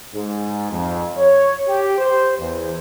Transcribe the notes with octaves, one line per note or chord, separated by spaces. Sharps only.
G#2
F2
C#5
G4
C5
E2